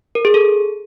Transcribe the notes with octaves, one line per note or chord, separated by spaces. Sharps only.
A#4
G#4
A4